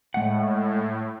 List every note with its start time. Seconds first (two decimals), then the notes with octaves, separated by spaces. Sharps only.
0.14 A2 G#3 A3 F#5